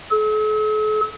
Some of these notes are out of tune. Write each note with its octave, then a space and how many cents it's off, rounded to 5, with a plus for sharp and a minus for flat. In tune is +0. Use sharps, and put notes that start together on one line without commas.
A4 -45